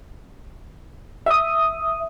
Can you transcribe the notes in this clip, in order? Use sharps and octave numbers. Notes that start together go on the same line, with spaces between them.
E5 D#6